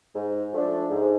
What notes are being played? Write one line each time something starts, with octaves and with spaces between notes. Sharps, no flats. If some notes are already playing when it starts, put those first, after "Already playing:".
G#2
F3 A3 D4
G#2